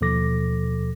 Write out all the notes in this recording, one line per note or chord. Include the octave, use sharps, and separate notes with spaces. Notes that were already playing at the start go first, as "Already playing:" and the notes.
D#2 B2 F3 A4 D6 A#6